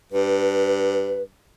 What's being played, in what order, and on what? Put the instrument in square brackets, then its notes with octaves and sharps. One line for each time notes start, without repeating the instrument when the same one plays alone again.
[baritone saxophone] G2 [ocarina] B4